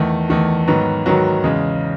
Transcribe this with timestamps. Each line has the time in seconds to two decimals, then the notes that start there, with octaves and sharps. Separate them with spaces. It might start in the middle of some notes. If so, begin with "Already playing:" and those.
Already playing: E2 D#3 A3
0.30 E2 D#3 A3
0.68 G#2 D#3 F#3 B3 F#4
1.06 G#2 D#3 F#3 B3 F#4
1.44 E2 C#3 G#3